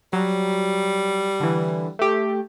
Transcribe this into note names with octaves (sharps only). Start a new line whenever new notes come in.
F#3 G3
D3 E3
A3 G4